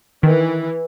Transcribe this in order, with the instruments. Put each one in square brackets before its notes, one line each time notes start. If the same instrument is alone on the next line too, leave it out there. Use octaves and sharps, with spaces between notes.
[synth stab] D#3 [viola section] E3